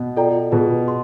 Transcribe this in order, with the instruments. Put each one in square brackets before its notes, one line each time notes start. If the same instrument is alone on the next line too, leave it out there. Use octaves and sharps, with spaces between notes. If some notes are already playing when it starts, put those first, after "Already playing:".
Already playing: [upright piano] B2
[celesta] F4 A4 D5 G5 A#5
[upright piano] B2 [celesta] F4 G#4 B4
[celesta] C6